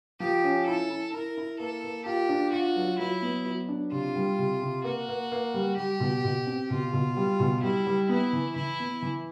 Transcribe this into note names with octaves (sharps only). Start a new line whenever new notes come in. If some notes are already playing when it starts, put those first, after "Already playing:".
F3 G4
C#4
E4 A4
E4
E4 A#4
E4
A#3 A4
A#3
F4 G4
D4
F4 F#4
F#3
F#3 E4
B3
F#3
D4
C3 F4
G3
C3
C3
A#3 F#4
A#3
A#3
G3
G3 G4
B2
B2
C4
B2 F4
B2
G3
B2
G3 E4
G3
B3 E4
E3
E3 E4
B3
E3